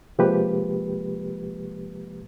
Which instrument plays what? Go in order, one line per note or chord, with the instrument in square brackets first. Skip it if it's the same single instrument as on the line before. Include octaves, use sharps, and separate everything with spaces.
[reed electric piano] C3 F3 G#3 A#3 G4 B4